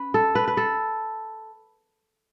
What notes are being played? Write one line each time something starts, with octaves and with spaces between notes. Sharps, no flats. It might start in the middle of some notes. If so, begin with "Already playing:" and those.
Already playing: C#4 B4
A4
B4
B4
A4